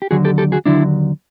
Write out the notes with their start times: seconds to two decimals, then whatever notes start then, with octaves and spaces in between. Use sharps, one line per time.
0.02 G4
0.11 D#2 D3 F#3 F#4 G#4
0.25 G4 A4
0.38 G4 A4
0.52 F#4 G#4
0.66 D#2 D3 F#3 D4 E4